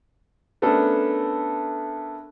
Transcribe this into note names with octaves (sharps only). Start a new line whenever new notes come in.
A3 B3 C#4 D4 A4 A#4